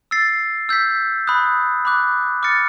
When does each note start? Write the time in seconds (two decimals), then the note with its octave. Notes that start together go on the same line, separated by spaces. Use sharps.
0.11 E6 A6 C7
0.69 E6 G6 B6
1.27 B5 D#6 F#6
1.85 B5 D6 F#6
2.43 D6 F6 A6 C#7